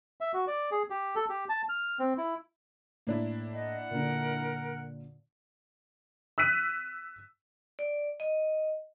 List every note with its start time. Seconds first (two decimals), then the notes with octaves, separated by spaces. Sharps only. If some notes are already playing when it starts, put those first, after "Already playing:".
0.21 E5
0.34 F#4
0.47 D5
0.71 G#4
0.90 G4
1.15 A4
1.29 G4
1.49 A5
1.69 F6
1.99 C4
2.18 E4
3.07 A2 A#3 D4 E4
3.54 D#5 F#5
3.91 A#2 D3 A#4
6.38 E6 F#6 B6 D#7
7.79 D5
8.20 D#5